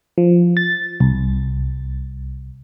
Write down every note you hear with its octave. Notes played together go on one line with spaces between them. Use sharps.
F3
A6
C2